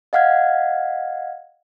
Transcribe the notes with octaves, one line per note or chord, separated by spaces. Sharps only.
D#5 F5 F#5 F6 G#6